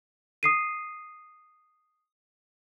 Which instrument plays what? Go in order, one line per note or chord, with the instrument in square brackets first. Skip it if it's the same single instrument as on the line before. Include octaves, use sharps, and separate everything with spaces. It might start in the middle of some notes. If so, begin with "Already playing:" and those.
[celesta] D#6 C7 D#7